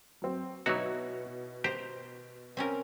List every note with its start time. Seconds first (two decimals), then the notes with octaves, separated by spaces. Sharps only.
0.22 F#3 C4
0.66 B2 F#3 D#4 E4 F#4 C#5
1.64 G4 C5 A#5
2.57 C4 C#4 A#4